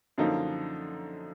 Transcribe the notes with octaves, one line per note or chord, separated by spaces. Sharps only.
F#2 D3 F3 A#3 D#4